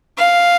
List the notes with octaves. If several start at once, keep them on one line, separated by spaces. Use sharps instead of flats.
F5